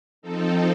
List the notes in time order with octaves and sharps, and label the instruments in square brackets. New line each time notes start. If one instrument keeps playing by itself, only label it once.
[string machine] F3 C4 D#4 A4